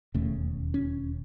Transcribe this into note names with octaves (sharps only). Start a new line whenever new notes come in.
E1 D#2 C#3 A3
C#4